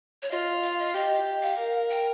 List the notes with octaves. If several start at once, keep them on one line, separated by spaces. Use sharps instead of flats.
C#5
F4 D#5
F5
D#5
G4 D#5
F5
A#4
G5